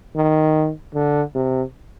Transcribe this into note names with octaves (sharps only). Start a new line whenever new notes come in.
D#3
D3
C3